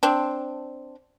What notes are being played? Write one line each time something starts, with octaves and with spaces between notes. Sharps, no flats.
C4 D4